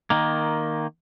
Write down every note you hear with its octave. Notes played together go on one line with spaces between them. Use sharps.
D#3 A#3